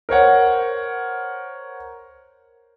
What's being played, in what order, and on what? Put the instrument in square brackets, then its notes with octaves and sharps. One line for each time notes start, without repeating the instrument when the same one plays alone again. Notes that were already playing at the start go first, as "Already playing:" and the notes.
[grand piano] A#4 C5 C#5 F#5